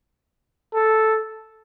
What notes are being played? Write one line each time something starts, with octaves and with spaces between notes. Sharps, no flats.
A4